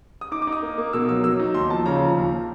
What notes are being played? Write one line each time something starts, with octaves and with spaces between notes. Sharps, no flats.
D#6
D#4 D6
D6
D#4
D#6
A#3
A#3
B2 E6
F#3 E6
F#3 E6
D#4
D#2 C6
F3 A5
C#3 A#5
F3
D#2